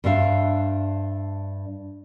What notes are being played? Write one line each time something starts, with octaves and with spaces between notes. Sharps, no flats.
G2 D4 C5 E5 F5